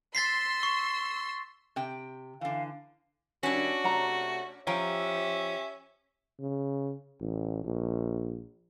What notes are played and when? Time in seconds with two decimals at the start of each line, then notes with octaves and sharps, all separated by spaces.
0.15 C6 E6 A6 B6 C7
0.63 C#6
1.76 C3 G5
2.41 D3 E3 F5
3.43 D#3 G3 C#4 D4 E4 F#4
3.84 C3 A3 F#5 A#5
4.67 F3 C#4 G4 E5 G5 A#5
6.39 C#3
7.20 A1
7.64 A#1